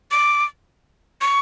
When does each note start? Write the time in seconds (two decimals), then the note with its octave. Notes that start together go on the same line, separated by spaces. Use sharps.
0.11 D6
1.21 C#6